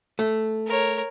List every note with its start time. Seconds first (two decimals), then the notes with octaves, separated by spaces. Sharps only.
0.19 A3
0.66 A#4 C#5